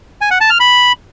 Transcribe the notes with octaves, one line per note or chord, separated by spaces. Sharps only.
G#5
F#5
A5
F6
B5